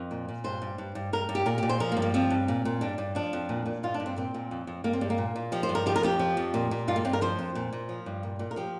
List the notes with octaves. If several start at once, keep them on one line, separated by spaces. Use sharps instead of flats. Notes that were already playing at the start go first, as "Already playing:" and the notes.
Already playing: F2 A#4
A#2
A#2
G2 C5
G2
G2
G2
G2 A#4
G2
G4
A#2 A#4
A#2 G4
C5
F3 A#4
A#3
G2
A#3
F3 C4
G2
A#2
A#2
G2 D4
G2
F3 D4
F2
A#2
A#2
G2 F4
D4
G2
C4
A#2 C4
A#2
F2
F2
G2 A#3
C4
G2 G3
A#3
A#2
A#2
F3 G4
C5
G2
A#4
F3 G4
A#4
F2 G4
F3
F2
A#2
A#2
G2 F4
A#3
G2 C4
A#4
F3 C5
F2
A#2
A#2
F3
G2
A#2
A#2
A#4
F3 G4